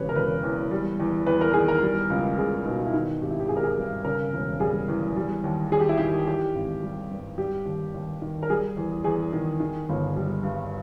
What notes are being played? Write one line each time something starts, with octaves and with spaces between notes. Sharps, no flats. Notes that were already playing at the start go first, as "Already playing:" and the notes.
Already playing: E1 C#3 G4 B4 C#5
A#4
E1 B4
E2
G3
E2
E2 B4
A#4
D#3 G#4
A#4
G3
C#2
C#2 G#4
B2 D#4
E4
D#3 D#4
G#1 G4
E4
G4
G#1 G#4
A#4
G#4
G2
C#3 A#4
E1
G3 G#4
E2
G3
D#2
D#2 G#4
G4
E4
D#3 G4
E3 G4
G#1
G3
G2
G3 G4
D#2
D#2
D#3
A#4
G3 G#4
E2
E2 G#4
D#3
D#3
G1
G3
G2